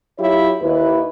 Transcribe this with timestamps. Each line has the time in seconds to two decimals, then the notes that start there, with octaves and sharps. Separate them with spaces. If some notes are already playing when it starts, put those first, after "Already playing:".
0.19 F#3 E4 F4 G4 C#5
0.61 D#2 E4 B4